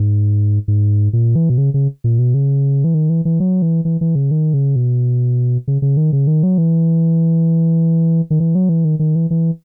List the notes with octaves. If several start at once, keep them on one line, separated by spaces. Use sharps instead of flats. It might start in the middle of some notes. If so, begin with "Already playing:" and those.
Already playing: G#2
G#2
A#2
E3
B2
C#3
C#3
A#2
B2
C#3
E3
D#3
E3
E3
F#3
E3
E3
E3
C#3
D#3
C#3
B2
C#3
C#3
D#3
C#3
D#3
F#3
E3
D#3
E3
F#3
E3
D#3
D#3
E3
E3